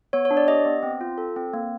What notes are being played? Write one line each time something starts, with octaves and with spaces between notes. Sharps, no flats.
B3 C#5
C#5
D4
D5
G4 D#5
B3
C4
F4
A4
C4
A#3